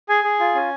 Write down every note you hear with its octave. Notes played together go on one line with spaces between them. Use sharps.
G#4 G#5
G#4
F4
C#4